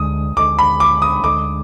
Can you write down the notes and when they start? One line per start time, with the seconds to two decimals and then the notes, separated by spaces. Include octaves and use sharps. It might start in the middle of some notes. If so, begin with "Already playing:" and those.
Already playing: D2 D3 G#3 D#6
0.36 D2 D3 G#3 D6
0.59 B5
0.80 D6
1.02 D#6
1.23 D2 D3 G#3 D6